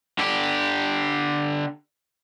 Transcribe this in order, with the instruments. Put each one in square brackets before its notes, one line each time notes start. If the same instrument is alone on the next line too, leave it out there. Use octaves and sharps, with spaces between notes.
[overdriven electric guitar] D3 G4